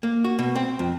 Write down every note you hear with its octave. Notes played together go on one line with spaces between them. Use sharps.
A#3
F#4
B2
C4
F2